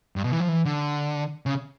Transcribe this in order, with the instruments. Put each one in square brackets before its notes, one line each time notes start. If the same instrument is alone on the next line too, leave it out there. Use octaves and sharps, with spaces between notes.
[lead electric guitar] G2
B2
E3
F3
E3
D3
C#3